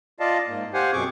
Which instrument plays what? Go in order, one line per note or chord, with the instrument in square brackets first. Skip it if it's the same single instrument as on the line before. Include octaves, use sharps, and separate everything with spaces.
[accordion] F4 D5 D#5 F5 A5
G#2 A#3
G4 C5 F5 F#5 G#5
F#2 B2 C4 G#4 C#6 D6